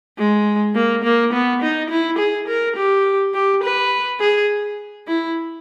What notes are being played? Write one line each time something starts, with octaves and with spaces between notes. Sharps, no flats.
G#3
A#3
A#3
B3
D#4
E4
G#4
A#4
G4
G4
B4
G#4
E4